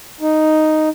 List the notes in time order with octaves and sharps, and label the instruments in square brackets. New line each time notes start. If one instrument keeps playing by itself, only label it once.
[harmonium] D#4